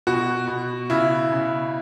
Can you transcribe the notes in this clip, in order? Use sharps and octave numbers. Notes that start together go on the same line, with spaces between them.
B2 F#4
B2
C#3 E4
C#3